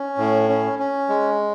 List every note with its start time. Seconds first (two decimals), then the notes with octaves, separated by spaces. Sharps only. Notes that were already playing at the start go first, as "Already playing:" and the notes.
Already playing: C#4
0.18 A2
0.49 C#4
0.79 C#4
1.09 G#3